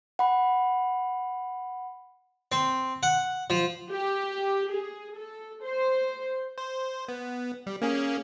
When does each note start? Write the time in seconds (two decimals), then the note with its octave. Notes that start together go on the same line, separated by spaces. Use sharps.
0.19 F#5 B5
2.52 C4
3.03 F#5
3.50 F3
3.92 G4
4.74 G#4
5.18 A4
5.63 C5
6.58 C5
7.08 B3
7.67 G3
7.82 A#3 C#4 G#4